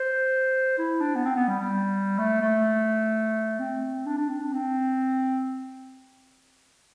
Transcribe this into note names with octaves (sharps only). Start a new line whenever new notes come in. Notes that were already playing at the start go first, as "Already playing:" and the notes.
Already playing: C5
E4
D4
B3
C4
B3
G3
G3
A3
A3
C4
D4
D4
C4
D4
C4